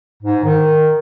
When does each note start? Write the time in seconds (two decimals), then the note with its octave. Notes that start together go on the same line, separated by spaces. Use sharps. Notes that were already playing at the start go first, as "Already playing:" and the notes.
0.22 G#2
0.44 D#3